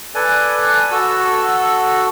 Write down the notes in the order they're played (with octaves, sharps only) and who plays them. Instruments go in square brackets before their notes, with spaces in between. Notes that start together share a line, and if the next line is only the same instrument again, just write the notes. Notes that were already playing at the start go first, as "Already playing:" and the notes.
[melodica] A4 B4 D5 G#5
F#4 A4 E6